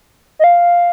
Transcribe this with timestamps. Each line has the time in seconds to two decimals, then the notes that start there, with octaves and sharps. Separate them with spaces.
0.39 D#5
0.44 F5